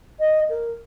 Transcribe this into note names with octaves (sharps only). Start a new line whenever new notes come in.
D#5
A#4